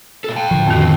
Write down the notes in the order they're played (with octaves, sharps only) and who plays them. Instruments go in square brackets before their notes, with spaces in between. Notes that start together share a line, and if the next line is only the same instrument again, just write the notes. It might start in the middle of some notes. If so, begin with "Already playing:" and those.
[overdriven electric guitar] A#2 A4
G5 A5
[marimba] A2 [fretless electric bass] D3 F3
[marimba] F2 D#3 [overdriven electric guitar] C4 F#4
[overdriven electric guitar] B3 C4